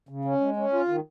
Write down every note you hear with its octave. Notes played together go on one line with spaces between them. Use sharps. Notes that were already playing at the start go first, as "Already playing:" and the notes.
C#3
C#4
G#3
C#4
F4
D#3